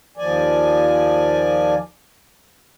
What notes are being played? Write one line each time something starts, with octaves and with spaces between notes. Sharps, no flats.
D#2 F3 D5 G#5